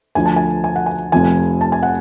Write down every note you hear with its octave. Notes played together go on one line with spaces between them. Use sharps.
D2 D3 F3 G#5
A5
G#5
G#5
F#5
G#5
F1 F2 F3 G#5
A5
G#5
F#5